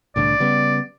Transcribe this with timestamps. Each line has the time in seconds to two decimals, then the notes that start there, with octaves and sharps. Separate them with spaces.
0.16 C2 A2 D3 D5
0.40 C#3 G3 B3